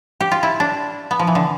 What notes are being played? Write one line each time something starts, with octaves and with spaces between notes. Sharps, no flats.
G4
F4
E4
D4
B3
F3
E3
D3